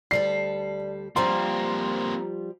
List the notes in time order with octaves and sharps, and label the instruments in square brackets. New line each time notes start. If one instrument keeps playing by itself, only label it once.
[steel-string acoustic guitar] D2 G3 A4 [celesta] D5 [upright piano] C7
[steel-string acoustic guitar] F3 G3 F4 [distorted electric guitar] A#3 C4 [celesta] A#5 [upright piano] C6